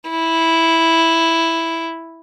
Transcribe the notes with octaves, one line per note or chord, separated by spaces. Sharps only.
E4